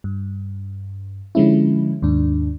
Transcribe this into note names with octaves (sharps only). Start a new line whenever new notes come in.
G2
D3 F3 G#3 C#4 E4
D#2 G#2 D4